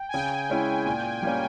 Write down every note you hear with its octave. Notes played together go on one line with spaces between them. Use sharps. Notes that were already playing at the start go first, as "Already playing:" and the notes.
Already playing: G5
G#5
C#3 G5
G#3 C#4 E4
A#2
G3 A#3 C#4